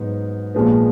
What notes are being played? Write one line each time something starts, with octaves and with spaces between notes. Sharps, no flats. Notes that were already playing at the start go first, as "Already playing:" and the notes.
Already playing: G#2 F#3 B3 D#4
A#1 A#2 F3 G#3 B3